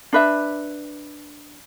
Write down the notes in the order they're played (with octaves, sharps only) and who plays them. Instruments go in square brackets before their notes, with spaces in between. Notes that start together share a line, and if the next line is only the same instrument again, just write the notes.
[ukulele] D4 B4 E5